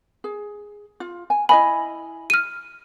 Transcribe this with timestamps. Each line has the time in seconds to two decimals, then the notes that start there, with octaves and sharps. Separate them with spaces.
0.24 G#4
1.00 F4
1.30 G#5
1.49 E4 D#5 G#5 B5
2.30 F6 D#7